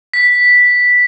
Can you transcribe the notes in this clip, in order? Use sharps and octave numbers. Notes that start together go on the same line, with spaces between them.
B6